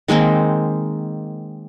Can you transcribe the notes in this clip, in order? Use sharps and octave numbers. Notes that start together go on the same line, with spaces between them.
D#3 G#3 A#3 C4